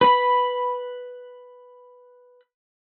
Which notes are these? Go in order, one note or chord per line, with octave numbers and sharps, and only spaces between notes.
B4 B5